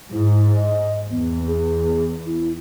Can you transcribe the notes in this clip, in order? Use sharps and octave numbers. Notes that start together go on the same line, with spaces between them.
G#2 E4
D#5
E2 B3
G#4
E4